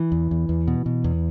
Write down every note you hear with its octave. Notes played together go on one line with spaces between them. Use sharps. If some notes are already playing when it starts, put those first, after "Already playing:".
Already playing: E3
E2
E2
E2
B2
B2
E2